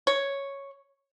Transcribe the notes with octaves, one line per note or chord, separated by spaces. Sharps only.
C#5